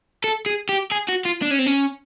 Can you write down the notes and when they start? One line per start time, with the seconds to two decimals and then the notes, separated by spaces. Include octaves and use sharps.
0.24 A4
0.46 G#4
0.69 G4
0.91 G#4
1.08 F#4
1.25 F4
1.42 D4
1.50 C#4
1.59 C4
1.66 C#4